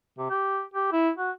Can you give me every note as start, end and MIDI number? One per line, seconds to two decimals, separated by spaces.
0.19 0.29 48
0.30 0.62 67
0.74 0.90 67
0.92 1.10 64
1.18 1.31 66